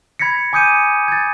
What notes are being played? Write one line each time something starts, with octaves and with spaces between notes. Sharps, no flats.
B5 G#6 A#6 B6 C#7
G#5 D6 D#6 G6 C#7 D#7
G#6 A6